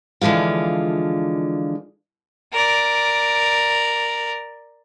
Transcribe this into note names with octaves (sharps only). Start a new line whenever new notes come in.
D3 E3 F3 G#3 F4
A#4 D5